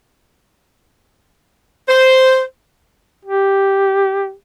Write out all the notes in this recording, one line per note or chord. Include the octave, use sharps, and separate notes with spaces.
C5
G4